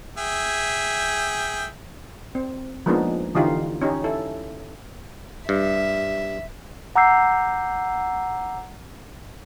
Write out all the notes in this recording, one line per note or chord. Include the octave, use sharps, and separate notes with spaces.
G#4 E5 G5
C4
F3 G#3 A#3 B3 D4 D#4
D3 E3 D#4 F4 G4
C#4 D#4 G4
E4 A4
G2 E5
F#5 A#5 D6 E6 G6 C7